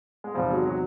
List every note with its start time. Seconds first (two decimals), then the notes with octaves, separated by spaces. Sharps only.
0.24 G#3
0.34 E2 C3 D#3 F3 G3
0.50 F#3 G#3
0.66 F#3